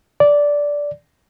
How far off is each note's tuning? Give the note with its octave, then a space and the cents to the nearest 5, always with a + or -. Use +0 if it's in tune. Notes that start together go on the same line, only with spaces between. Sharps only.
D5 -10